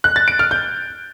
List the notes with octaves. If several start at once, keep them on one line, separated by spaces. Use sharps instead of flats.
F#6
A6
D7
F6
G6